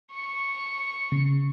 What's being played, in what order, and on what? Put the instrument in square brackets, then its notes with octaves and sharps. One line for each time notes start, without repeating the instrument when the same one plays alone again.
[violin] C#6 C#7
[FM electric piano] C#3